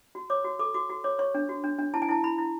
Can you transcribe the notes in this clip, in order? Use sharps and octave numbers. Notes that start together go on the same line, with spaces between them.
F#4
C#5 D6
F#4
A4 D6
F#4 D6
F#4
C#5 D6
C#5 C#6
D4
F#4
D4
D4
E4 A5
G#5
E4 A5
E4 B5
E4